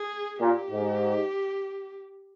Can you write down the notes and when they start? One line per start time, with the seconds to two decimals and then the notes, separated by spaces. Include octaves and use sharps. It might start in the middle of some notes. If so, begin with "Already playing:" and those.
Already playing: G#4
0.40 A#2 G4
0.70 G#2